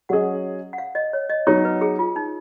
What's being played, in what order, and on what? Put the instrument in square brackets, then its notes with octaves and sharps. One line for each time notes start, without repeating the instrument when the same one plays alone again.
[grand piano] F#3 C#4 G#4 D#5 [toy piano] F#5
[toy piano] F#5
F5
D#5
C#5
D#5
[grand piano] F#3 B3 D#4 [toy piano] C#5
[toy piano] B4
G#4
F4
D#4